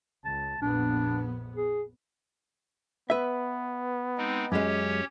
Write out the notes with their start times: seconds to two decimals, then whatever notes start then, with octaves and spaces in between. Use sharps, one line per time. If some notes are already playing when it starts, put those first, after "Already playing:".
0.25 C#2 A5
0.62 A#1 F2 B3 D4
1.56 G#4
3.10 B3 B4 E5
4.18 G#3 C4 D#4
4.52 F#2 G#3 C#4 G4 C#5